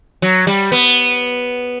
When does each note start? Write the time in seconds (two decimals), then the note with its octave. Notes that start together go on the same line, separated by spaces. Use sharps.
0.22 F#3
0.47 G3
0.72 B3